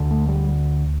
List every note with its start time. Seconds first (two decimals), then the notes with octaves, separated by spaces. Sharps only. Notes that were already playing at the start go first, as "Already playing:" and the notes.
Already playing: D2 D3
0.11 A3
0.28 G3